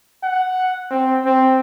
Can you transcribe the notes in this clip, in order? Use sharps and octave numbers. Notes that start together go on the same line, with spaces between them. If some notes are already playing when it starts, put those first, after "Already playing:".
F#5
C4
C4